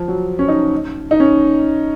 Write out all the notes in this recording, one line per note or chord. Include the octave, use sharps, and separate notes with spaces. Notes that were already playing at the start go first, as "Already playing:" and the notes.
Already playing: F3
F#3
C#4
D#4
D#4
C#4